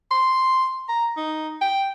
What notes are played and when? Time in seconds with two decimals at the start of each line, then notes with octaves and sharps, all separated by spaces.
0.11 C6
0.89 A#5
1.17 D#4
1.61 G5